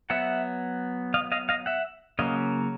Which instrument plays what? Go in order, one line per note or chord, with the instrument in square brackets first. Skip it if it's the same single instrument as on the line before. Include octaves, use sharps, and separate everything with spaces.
[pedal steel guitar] F#3 B3 E5 F#5
D#5 F5
D#5 F5
D#5 F5
E5 F#5
C#3 F#3 A#3 C#4 D#5 F5